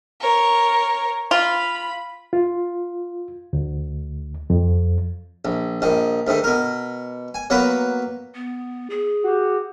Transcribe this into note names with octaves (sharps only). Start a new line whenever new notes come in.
A#4 C#5
F4 B5
F4
D2
F2
A#1
A#1 D#3
D2 G#2 D#3
B2 A#4
G#5
F#3 A#3 B3 B4
B3
G#4
F#4 G4